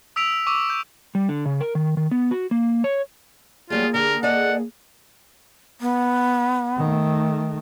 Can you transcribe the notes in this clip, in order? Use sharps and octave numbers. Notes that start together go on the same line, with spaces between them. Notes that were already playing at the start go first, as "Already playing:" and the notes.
D#6 E6 B6 D7 F7
C#6 D6 E6
G6
G3
D3
C#3
A#4
D#3
D#3
B3
F#4
A#3
C#5
F#3 G3 A3 A#3 F4 G#4
D3 G4 A#4
A4 D5 D#5 F#5
B3
D#3 A3